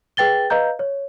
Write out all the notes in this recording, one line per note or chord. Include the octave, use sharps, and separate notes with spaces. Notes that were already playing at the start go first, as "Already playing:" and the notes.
G#4 B4 G5 A6 G7
B4 D#5 F5 A#5 G6
C#5